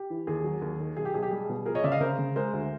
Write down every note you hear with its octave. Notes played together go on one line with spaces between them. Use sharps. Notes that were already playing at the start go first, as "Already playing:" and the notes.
Already playing: G4
E3
D#2 G#4
F#3
D#2
D#3
B1 G#4
G4
B1 G#4
G4
G3 G#4
B2
F3 G#4 A#4
C#5 D#5
C#3 D5 E5
D#5 F5
C#3 A#4 C5
C#3
G#3 A#4 C5
D2